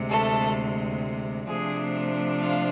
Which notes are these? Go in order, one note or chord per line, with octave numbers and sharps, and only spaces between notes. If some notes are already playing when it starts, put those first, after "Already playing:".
Already playing: D2 C3 G#3
A3 A4
C3 F3 A3 D4 G#4
F4 F5